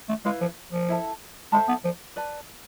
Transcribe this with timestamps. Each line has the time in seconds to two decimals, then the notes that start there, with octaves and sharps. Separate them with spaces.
0.09 A3
0.25 G#3 E4 B4 F5
0.41 F3
0.73 F3
0.89 E4 A4 E5 A5
1.52 G#3 A4 C5 E5 A5
1.68 B3
1.85 F3
2.16 B4 D5 A5